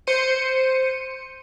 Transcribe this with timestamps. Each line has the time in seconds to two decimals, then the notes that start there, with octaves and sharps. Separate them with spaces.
0.07 C5 C#7 D#7